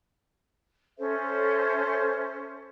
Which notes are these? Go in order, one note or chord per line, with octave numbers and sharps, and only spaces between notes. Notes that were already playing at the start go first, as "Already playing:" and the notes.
C#4 A4 C5 E5